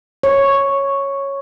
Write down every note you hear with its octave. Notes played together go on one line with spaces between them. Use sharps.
C#5